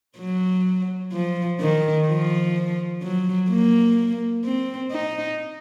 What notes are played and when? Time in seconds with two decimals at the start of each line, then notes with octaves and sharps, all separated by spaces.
0.18 F#3
1.12 F3
1.60 D#3
2.07 F3
3.02 F#3
3.50 A#3
4.44 C4
4.92 D#4